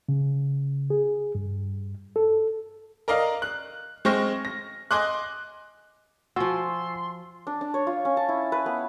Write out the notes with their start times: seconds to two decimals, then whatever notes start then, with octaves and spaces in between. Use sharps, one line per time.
0.09 C#3
0.90 G#4
1.35 G2
2.16 A4
3.08 A#4 D5 D#5 F5 F6
3.42 F#6
4.05 G#3 C4 C5 C#6 F6 A#6
4.45 A#6
4.91 D#5 G#5 C6 D6 F#6
6.36 F3 F4 F#4 G#5 C6 C#6 E6
7.47 D4
7.61 D4
7.74 C#5
7.87 F4
8.05 C#4
8.17 A5
8.29 E4
8.52 B4
8.66 B3